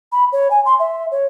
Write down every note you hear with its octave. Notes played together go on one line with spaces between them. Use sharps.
B5
C#5
G#5
C6
E5
C#5